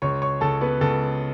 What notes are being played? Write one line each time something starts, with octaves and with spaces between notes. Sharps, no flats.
C#2 C#5 C#6
C#5 C#6
C#2 A4 A5
B3 B4
C#2 A4